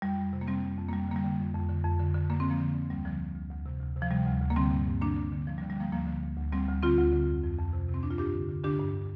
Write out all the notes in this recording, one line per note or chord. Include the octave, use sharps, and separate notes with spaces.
F2 G3
F2
C3
A#3
F2 G3 C4
F2
F2
A#3
F2 G3
D3 A#3
G3
D3
F2
F2
D3
F2
D3
D3
D3 A#3
D3 C4
F3 A#3
D3
D3
D2 G3
D3 F3
D3
D2
D2
C3
D2
C3
F3
C3 G3
D2
D2
A#3
D3 G3 C4
G2
G2
D3 A#3 D4
D3
D3
D3 F3
G3
D3
G3
D3 F3 A#3
D2 F3 A#3
D3
D2
D2
D2 G3 C4
D2
D3 C4 F4
D2
D3
F2
F2
F2
C3
C3
C4
F2 D4
F4
G2 D4 G4
D3
D3
D3 D4 G4
G2